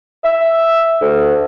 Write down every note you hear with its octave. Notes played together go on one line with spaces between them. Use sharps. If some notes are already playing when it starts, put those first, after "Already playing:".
E5
D2